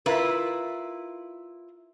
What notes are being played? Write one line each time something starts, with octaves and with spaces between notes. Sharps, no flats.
E4 F4 A#4 B4